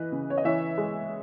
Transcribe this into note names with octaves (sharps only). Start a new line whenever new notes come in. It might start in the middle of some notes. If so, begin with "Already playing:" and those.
Already playing: E3 B4 D#5
C#3
C#5
D#5
E3 C#5 E5
G#3